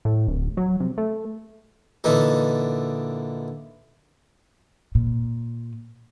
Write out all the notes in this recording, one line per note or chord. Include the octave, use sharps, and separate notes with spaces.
A2
D1
F#3
C3
A3
A#2 D3 E3 D#4
A#2